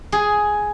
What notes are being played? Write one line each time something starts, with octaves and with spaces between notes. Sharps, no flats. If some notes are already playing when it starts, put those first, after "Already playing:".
G#4